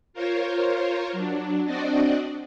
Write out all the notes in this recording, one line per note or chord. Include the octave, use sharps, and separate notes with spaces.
F4 A#4 C5 C#5
F#3 D4
C4 D4 F#4 D5 D#5